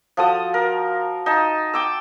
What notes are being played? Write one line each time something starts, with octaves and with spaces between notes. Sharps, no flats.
F3 F#4 A4 D#6
A#4
D#4 A5
G5 D6 E6